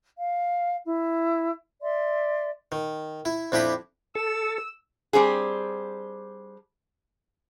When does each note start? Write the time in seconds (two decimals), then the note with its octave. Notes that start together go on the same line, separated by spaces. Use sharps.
0.18 F5
0.85 E4
1.82 D5 E5 C6
2.72 D#3
3.25 E4
3.52 F2 D4 E4 G4 B5 D#6
4.15 A4 E6
5.13 G3 C4 D4 G#4